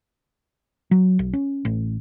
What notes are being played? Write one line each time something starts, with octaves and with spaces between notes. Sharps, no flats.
F#3
B1
C#4
A1